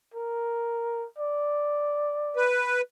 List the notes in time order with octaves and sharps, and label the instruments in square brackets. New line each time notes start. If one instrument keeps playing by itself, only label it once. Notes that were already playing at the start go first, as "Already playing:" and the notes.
[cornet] A#4
D5
[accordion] B4